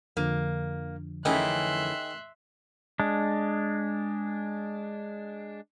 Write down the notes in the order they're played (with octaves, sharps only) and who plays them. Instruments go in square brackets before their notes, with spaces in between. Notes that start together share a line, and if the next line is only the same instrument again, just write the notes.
[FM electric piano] F2 D3 F3 [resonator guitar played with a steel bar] A#3
[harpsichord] D#3 G#4 [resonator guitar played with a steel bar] E3 A3 C#4 [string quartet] E5 C6 F#6
[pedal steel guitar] G#3 D4